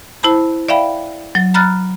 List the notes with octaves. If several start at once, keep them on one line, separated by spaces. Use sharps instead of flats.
E4 C5 A5 B5
D5 E5 F5 G5 B5
F#3 A6
A#5 B5 F6 F#6 A6